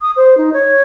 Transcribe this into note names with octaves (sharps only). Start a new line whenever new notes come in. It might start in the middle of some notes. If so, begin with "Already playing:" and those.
D#6
C5
D#4
C#5